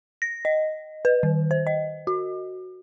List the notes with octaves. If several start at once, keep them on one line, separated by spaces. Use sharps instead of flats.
A#6
D#5
B4
D#3
C5
D#5
F#4